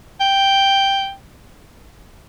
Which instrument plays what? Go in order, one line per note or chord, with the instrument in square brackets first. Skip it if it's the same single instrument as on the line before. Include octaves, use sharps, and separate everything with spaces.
[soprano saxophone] G5